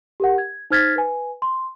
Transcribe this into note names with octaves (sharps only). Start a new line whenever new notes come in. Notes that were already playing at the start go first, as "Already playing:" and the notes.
G4 A#4 F#5
G#6
D#4 C5 F6 G#6 A6 B6
B4 G#5
C6